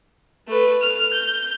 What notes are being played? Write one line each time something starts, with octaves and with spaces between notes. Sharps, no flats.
A3 B4
F6
G6